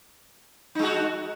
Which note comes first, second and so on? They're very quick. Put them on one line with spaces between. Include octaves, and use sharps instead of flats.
D#4 G#3 F#4